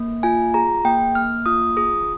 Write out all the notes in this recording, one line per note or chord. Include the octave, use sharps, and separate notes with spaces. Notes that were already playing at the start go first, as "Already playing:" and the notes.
Already playing: A#3
F4 G#5
G#4 A#5
A#3 G5
A#3 F6
F4 D#6
G#4 D#6